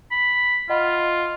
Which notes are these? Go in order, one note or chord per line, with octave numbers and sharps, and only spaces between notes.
B5
F4 D#5 F#5 B5